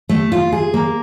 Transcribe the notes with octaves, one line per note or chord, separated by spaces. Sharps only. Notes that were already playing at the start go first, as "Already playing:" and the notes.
A3
F4
G#4
A#3